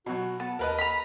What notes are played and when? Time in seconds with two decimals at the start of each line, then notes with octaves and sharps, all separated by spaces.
0.06 B2 F#3 F#4
0.40 B3 A5
0.59 D#2 A#4 B4 D#5
0.78 A#5 B5